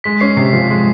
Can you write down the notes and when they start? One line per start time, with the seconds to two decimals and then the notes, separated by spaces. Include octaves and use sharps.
0.04 G#3 B6
0.20 C#4 C7
0.37 C3 C7
0.53 F3
0.70 G#3